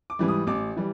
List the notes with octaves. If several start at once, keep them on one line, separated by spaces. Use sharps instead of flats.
D6
G#2 E3 G3
D#6
A1 D6
E3 G3